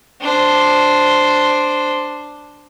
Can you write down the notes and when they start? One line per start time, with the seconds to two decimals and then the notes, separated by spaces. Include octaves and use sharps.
0.21 D4 C5